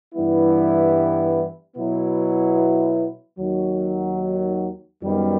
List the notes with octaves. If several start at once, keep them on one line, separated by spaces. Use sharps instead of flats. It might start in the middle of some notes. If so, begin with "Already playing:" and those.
G2 E3 G3 B3 E4
B2 F#3 B3 E4
D#2 D#3 F#3
F#2 D#3 G3 B3